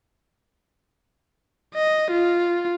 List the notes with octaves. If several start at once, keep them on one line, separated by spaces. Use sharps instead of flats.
D#5
F4